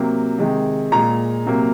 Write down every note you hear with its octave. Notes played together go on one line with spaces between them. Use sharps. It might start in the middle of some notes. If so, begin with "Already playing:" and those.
Already playing: C3 F#3 A#3
C3 D#3 G#3
A#2 G#3 A#5
C3 F#3 A#3